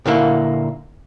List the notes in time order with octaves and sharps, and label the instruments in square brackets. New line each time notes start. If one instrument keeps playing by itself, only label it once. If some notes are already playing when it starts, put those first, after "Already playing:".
[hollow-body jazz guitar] A#2 D3 A#3 E4